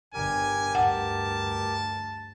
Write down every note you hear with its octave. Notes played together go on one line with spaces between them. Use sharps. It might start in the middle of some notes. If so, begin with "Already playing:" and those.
G1 D3 G4 A#4 G#5
D2 G2 F#5 A5